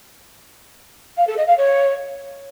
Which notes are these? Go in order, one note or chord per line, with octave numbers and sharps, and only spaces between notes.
F5
A4
D#5
F5
C#5